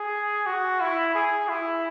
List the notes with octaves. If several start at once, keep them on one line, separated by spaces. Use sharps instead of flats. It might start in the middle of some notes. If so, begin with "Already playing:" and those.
Already playing: G#4
F#4
E4
G#4
E4